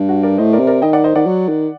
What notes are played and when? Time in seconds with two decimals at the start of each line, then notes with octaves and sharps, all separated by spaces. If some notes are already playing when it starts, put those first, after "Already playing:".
Already playing: G2
0.09 F#4
0.23 A#4 D5
0.38 A2 C5 D#5
0.53 A#4 D5
0.60 C3
0.67 A#4 D5
0.82 D#3 D#5 G5
0.93 D5 F#5
1.04 C5 D#5
1.15 D#3 D5 F#5
1.26 F#3
1.49 D#3